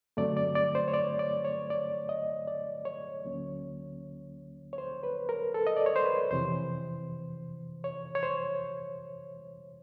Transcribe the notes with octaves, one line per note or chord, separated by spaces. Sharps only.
G2 D3 F#3 A3 C4 D5
D5
D5
C5
C#5
D5
D5
C#5
D5
D#5
D5
C#5
D2 D3 F#3 A#3 C#4
C#5
C5
B4
A#4
A4
D#5
D5
C#5
C5
B4
F2 C3 E3 C5
C#5
C#5
C5